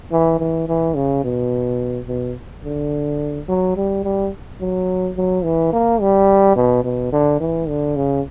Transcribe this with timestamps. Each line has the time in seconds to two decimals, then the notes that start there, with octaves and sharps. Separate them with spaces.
0.12 E3
0.40 E3
0.68 E3
0.96 C#3
1.24 B2
2.09 B2
2.65 D3
3.49 F#3
3.77 G3
4.04 G3
4.61 F#3
5.17 F#3
5.44 E3
5.73 A#3
6.01 G3
6.56 B2
6.84 B2
7.13 D3
7.40 E3
7.69 D3
7.96 C#3